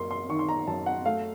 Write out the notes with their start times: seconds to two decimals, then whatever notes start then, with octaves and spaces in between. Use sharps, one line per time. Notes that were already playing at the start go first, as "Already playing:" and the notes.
Already playing: F#2 A#3 C6 C#6
0.11 C6
0.29 D#3 C#6
0.39 C6
0.49 A#5
0.67 F#2 A5
0.86 F#5
1.05 A3 F5